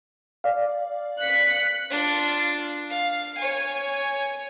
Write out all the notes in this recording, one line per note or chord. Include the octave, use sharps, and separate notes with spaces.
D5 F5
F#6 B6 C#7
D4 F4
F5
C#5 G#5